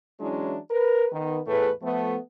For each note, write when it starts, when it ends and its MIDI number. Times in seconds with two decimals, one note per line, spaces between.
0.20 0.57 52
0.20 0.57 54
0.20 0.57 56
0.20 0.57 61
0.20 0.57 62
0.20 0.57 64
0.71 1.06 70
0.71 1.06 71
1.13 1.40 51
1.13 1.40 59
1.47 1.70 40
1.47 1.70 45
1.47 1.70 57
1.47 1.70 68
1.47 1.70 71
1.83 2.16 53
1.83 2.16 57
1.83 2.16 59